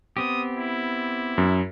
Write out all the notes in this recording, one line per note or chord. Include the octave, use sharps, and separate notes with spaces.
B3 C4 G4 D#6
E4
F#2